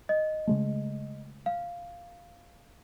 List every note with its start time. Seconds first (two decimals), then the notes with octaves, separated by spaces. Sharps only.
0.09 D#5
0.47 C#3 G#3 A3
1.46 F5